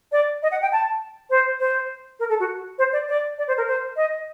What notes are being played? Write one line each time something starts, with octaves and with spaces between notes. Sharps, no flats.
D5
D#5
F#5
G5
A5
C5
C5
A#4
A4
F#4
C5
D5
D5
D5
C5
A#4
C5
D#5